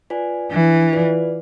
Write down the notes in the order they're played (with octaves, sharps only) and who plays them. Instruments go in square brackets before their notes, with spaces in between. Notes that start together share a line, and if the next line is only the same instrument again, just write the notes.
[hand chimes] F4 B4 D5 G#5
[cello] E3 [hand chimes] D4
[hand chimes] F4 B4 D5